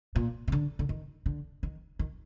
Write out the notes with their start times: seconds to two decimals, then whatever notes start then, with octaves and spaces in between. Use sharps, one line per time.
0.16 A#2
0.48 C3
0.52 D3
0.79 D3
0.89 D#3
1.26 D3
1.63 D#3
1.99 D#3